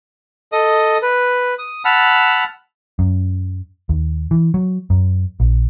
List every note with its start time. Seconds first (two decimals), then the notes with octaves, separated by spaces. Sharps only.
0.52 A4 D#5 D#6
1.02 B4
1.59 D#6
1.85 F#5 A5 B5 E6 F6
2.99 F#2
3.89 D#2
4.31 E3
4.54 F#3
4.90 F#2
5.40 A#1